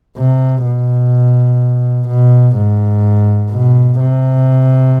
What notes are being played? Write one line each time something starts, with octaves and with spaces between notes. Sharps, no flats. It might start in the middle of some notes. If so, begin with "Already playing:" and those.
C3
B2
B2
G#2
B2
C3